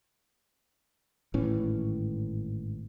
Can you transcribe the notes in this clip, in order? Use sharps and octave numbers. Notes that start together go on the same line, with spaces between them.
G#1 A2 E3 C#4